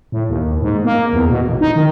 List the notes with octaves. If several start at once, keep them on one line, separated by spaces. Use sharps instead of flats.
A2
D#2
G#2
A#3
E2
B2
A1
D#4
D#3